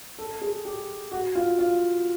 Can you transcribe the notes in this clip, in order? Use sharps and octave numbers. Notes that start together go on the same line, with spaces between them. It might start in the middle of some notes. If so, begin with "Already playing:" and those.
A4
G#4
G4
F#4
F4
F4